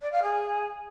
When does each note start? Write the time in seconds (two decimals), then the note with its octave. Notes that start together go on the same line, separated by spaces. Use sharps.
0.02 D5
0.12 F5
0.23 G#4